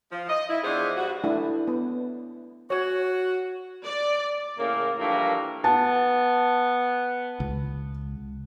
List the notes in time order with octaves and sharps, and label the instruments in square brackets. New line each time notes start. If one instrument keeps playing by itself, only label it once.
[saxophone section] F3
D#5
E4
E3 B3 D4 F4 G#4 C5
G2 F#4
[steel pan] A3 D4 E4
B3
[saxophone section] F#4 [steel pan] C#5
[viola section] D5
[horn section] A2 C#3 A#3
G2 E3 F3 A3 A#3
[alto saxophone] B3 [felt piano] A5
[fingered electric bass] C#2